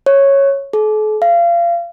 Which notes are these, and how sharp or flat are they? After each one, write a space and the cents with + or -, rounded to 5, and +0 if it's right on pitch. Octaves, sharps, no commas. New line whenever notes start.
C#5 -5
A4 -45
F5 -30